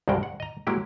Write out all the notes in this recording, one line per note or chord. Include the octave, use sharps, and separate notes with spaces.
C2 G2 C#3 G#3 F#4 G5
F#5
D#5 A#5
F#3 G#3 A#3 E4 G4